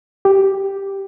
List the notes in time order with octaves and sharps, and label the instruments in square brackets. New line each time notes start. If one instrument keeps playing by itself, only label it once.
[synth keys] G4